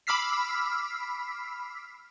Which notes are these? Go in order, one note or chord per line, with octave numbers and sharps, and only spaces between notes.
B5 D6 E6 F6 B6 C7